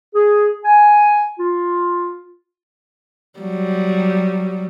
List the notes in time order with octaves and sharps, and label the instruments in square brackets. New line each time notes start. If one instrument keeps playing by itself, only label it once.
[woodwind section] G#4
G#5
F4
[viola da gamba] F#3 G3